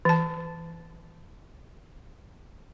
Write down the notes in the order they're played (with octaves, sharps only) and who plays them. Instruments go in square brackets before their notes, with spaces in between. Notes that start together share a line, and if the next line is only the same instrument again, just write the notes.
[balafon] E3 A5